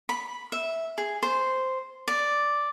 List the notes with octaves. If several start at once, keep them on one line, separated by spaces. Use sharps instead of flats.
B5
E5
G#4
C5
D5